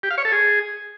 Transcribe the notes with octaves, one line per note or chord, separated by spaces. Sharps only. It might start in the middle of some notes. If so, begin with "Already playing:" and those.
G4
F5
C#5
A4
G#4